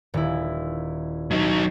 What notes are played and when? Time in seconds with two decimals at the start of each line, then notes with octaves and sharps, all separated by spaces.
0.14 D#1 E4
1.31 F#3 D#4